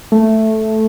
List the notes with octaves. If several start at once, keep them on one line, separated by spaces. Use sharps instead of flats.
A3